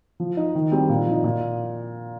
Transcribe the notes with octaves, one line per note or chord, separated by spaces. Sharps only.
F3
D#4
D#3
G3 C4
A#2
F3 D#4
A#2